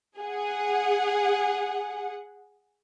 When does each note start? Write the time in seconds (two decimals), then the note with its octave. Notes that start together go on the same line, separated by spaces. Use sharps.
0.19 G#4 F#5